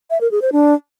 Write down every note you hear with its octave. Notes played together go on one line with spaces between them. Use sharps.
E5
A#4
G#4
C5
D4